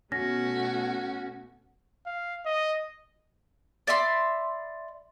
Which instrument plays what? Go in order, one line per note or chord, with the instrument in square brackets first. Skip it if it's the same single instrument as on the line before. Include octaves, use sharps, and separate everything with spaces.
[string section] B2 A3 [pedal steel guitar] C#4 [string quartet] F#4 [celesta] A#6
[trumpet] F5
D#5
[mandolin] D5 E5 B5 C6